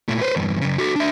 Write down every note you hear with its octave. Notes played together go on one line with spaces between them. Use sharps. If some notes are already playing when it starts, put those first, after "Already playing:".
A#2 A3
B4 C5
E2 G2
F#2 C#3
F#4 A4
D4 E5